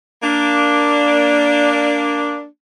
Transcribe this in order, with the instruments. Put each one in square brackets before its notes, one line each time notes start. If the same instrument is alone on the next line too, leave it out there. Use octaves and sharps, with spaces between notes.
[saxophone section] A#3 D4